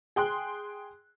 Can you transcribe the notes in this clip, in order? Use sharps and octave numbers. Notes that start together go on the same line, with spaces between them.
G#4 G5 C6 F#6